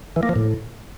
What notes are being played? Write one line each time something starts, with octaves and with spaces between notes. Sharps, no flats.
E3
A#3
F3
A2